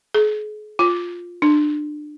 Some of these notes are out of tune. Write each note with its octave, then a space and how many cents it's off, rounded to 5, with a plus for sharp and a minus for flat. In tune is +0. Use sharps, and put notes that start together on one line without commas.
G#4 +40
F4 +5
D4 +25